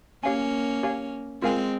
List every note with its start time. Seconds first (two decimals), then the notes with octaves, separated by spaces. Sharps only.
0.24 A#3 C#4 G4 C#5 F5 G#5
0.83 G4 C#5 F5 G#5
1.42 G#3 C4 F4 A#4 F5 G#5